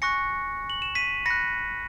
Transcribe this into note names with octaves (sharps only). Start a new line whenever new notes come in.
G#5 C#6 F#6 A#6 C#7
F#7
E7
B6 D#7
B5 F#6 A#6 C#7